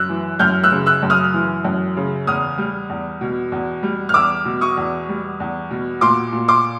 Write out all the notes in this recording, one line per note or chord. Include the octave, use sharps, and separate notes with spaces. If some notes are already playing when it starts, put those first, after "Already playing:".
Already playing: F#2 E6 F#6
E3
F#2 F6 G6
E6 F#6
C#3
E6 F#6
F#2
D#6 F6
E3
F#2
C#3
E2 D#6 F6
G3
E2
B2
E2
G3
F6
E2 D6 E6
B2
C#6 D#6
E2
G3
E2
B2
A#2 C6 D6
A#2
C6 D6